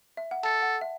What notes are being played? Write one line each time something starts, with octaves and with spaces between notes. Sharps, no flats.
E5
F#5
A4 A5
F#5
E5